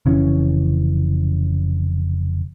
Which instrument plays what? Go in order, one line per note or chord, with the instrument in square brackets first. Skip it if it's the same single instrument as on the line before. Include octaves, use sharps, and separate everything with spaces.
[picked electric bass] F1 C#3 E3 C#4